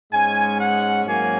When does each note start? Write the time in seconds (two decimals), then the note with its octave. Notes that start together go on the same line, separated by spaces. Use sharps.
0.11 G#2 G#3 C#4 G#5
0.58 F#5
1.05 G#2 F#3 A#3 C#4 G#5